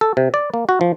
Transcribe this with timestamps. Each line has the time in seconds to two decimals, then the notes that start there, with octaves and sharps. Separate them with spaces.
0.01 A4
0.17 C3
0.34 D5
0.54 A#3
0.69 F#4
0.81 F3